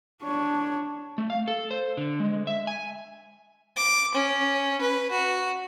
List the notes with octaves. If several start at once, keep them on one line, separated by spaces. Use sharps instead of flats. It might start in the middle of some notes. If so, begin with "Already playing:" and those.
D4 C#5
A3
F5
A4
C5
D3
G#3
E5
G#5
D6
C#4
B4
F#4